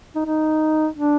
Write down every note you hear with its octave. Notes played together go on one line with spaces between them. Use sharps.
D#4
D#4
D4